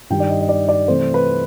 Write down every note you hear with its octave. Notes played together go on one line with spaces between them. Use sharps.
G2 D#3 G3 G5
D5
D#5
D#5
D5
D5
C3 E3 A3 C4 C5
B4